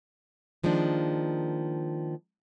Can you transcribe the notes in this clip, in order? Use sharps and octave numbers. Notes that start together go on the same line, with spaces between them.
D#3 F3 G#3 A#3 D4